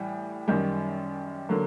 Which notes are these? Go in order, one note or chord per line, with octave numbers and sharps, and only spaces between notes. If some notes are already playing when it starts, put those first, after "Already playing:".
Already playing: A2 E3 G3
F#2 D#3 G3
D3 F#3 A#3